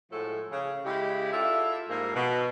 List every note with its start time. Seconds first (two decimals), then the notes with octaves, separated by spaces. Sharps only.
0.11 A2 F3 G#3 E4 F#4 A4
0.52 C#3
0.85 C#3 G#3 E4 G4
1.32 E4 F4 A4 D5 E5
1.89 G#2 F3 G3 G#3 A#3
2.15 B2